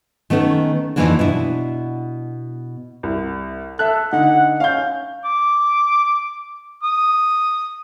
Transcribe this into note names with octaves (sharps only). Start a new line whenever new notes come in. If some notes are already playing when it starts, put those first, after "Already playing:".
D#3 A3 B3 C#4
F2 A#2 D#3 E3 A#3 D4
B2 D4 E4
C2
A4 E5 F#6
D3 D#4 F#5
C#4 F5 G6
D6
D#6